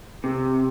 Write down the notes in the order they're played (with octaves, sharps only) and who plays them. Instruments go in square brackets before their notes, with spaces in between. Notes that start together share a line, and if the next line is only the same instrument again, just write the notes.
[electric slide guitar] C3